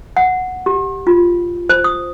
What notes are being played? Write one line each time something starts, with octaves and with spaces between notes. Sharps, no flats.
F#5
G4
F4
C5
D#6